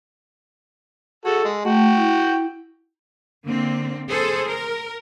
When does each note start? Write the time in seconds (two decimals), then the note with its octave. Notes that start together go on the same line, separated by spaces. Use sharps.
1.25 F#4 G#4 A4
1.44 G#3
1.65 A3 F#4 G5
1.97 E4
3.44 D3 A#3 C4
4.09 G#4 A4 C5
4.48 A#4